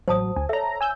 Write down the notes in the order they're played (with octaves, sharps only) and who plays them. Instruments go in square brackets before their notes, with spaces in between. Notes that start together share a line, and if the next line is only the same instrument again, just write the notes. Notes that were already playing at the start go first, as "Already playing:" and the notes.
[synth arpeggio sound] A1 F#3 [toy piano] C5 A5 D#6
[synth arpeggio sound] D2 G#5
[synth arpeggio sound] A4 A#5 [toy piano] C#5 E5
[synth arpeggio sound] G#5 E6 G6